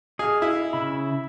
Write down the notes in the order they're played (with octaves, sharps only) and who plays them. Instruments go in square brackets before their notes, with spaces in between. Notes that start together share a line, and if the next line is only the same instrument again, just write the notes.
[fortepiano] G#4 [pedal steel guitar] D#5 F5
[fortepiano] E4
[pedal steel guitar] C#3 E5 B5